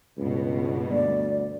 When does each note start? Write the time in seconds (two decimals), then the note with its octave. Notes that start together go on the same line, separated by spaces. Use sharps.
0.17 C#2 G2 B2
0.91 D2 D5